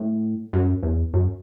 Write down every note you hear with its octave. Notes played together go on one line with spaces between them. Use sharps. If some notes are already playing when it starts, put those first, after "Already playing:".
Already playing: A2
F#2
E2
F#2